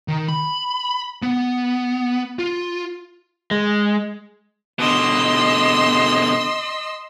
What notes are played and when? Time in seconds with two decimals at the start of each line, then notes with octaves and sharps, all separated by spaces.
0.08 D#3
0.28 B5
1.22 B3
2.39 F4
3.51 G#3
4.79 B2 D3 D#5 C6 E6